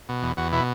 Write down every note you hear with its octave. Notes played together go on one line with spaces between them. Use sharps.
B2
E2
E2 F#4
B2 E4